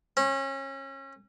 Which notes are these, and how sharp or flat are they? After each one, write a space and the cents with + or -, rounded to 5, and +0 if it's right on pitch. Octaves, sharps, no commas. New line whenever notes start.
C#4 -30